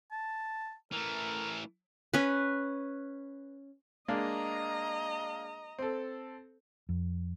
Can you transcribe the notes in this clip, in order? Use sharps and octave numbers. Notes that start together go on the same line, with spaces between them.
A5
E3 A3 A#4
C#4 B4
G#3 A#3 D4 D#5 A#5
C4 A4
F2